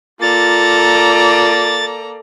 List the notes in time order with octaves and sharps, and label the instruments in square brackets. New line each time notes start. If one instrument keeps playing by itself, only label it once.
[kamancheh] A#3 D5 [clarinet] F4 [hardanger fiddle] A4 A#5 [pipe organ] A6